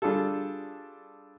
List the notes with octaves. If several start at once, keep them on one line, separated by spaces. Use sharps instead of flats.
G3 D4 F4 G#4 A4